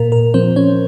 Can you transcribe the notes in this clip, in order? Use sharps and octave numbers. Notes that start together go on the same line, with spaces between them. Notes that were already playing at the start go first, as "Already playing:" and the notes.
Already playing: A#2 A#4
A#4
F3 C4 C5
C#4 C#5